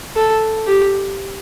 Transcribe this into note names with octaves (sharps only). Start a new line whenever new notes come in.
A4
G4